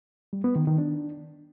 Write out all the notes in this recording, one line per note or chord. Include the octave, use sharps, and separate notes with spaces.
G3
B3
D#3
D#3
D4